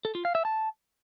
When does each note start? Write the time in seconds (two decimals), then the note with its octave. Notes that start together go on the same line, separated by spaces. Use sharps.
0.05 A4
0.15 F4
0.25 F5
0.35 E5
0.45 A5